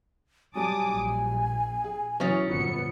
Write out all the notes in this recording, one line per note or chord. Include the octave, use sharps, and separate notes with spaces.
F#3 G3 G#5 A5 D6 D#6
A#1
G#4
F#2 E3 F#3 C#4 D#6 A6
G1 F2 A#2 B3 C#7